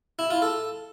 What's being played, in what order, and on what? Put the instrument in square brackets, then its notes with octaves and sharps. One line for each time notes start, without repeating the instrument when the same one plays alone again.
[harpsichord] E4
F4
A4